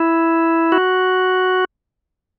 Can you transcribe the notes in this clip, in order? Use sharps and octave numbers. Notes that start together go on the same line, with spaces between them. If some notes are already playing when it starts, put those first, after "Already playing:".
Already playing: E4
F#4